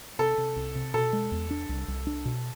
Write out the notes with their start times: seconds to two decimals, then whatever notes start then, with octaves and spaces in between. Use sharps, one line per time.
0.19 C3 A4
0.38 C3
0.56 C2
0.75 C3
0.94 B2 A4
1.13 G#3
1.32 E2
1.51 D4
1.69 C2
1.88 C2
2.07 D4
2.25 B2